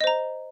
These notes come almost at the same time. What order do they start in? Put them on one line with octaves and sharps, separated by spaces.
D#5 C5 A#5